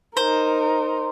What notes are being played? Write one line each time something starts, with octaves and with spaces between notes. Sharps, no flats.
D#4 A#4 C5